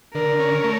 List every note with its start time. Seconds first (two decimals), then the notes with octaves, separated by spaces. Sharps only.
0.14 D3 A#4
0.39 C#4
0.64 A3